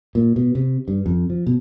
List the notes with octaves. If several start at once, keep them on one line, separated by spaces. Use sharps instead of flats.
A#2
B2
C3
G2
F2
F3
B2